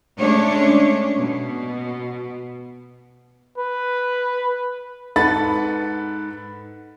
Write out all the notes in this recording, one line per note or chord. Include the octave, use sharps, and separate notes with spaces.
G#3 A3 C#4 D4 C#5
B2
B4
G#2 A4 B4 F#5 B5 A6